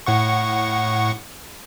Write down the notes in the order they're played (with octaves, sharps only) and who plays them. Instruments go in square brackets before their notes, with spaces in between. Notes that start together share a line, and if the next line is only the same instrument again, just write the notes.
[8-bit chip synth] A2 F#5 C#6